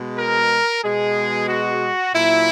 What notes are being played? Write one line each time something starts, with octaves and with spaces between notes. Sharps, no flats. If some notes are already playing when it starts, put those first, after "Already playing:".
Already playing: B2 G#3
A#4
B2 G#3 G#4
F#4
A#2 F#3 A#3 E4